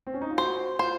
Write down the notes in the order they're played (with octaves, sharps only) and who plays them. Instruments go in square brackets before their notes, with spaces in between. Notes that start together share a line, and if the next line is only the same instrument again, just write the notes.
[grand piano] C4
C#4
D#4
F4
[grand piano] F#4 [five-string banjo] C5
[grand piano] F4 [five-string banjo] C5